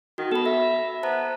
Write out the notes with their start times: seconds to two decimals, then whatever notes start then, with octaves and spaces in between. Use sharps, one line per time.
0.18 D#3 F#4
0.31 B3 A4 B5
0.46 E5 A#6
1.03 B3 C5 A5 A#5